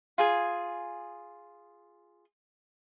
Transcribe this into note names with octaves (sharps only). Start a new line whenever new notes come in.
F4 G#4 G#5